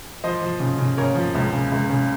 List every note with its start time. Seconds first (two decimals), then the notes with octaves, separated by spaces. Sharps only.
0.24 F3 C5 D#5
0.41 F3
0.60 C#3
0.78 C#3
0.97 C#3 A#4 C#5
1.15 F3
1.35 C#2
1.53 C#3
1.72 C#2
1.90 C#3